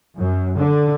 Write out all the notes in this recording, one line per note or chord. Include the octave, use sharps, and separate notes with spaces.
F#2
D3